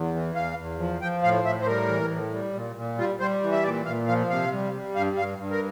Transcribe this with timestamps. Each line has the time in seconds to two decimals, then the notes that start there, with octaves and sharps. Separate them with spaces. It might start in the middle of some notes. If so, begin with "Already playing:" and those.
Already playing: E2
0.14 E3
0.35 E2 F5
0.58 E2
0.79 F3
1.01 F3 G5
1.23 A2 F5
1.44 A2 E5
1.61 C5
1.67 G3 A#4
1.88 E3
2.11 A2
2.33 G3
2.54 A#2
2.76 A#2
2.98 G3 F4
3.20 G3 C5
3.43 E3
3.52 E5
3.63 A#2 D5
3.86 A#2 F5
4.07 F3 F5
4.30 C3 F5
4.52 G3
4.74 G3
4.96 G2 F5
5.17 G2 F5
5.38 G2
5.51 A#4